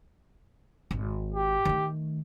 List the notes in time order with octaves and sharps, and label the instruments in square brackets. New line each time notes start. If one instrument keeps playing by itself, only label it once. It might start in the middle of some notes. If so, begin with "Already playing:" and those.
[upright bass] G#1
[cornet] G4
[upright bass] D#3 A3